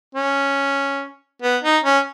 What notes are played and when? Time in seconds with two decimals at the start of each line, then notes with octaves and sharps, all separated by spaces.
0.15 C#4
1.42 B3
1.64 D#4
1.84 C#4